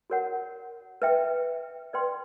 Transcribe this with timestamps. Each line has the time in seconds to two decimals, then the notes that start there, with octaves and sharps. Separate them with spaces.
0.10 F#4 A#4 C#5 F#5
1.02 B4 E5 G5
1.93 B4 D5 G5 C6